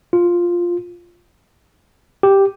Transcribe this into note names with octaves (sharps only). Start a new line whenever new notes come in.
F4
G4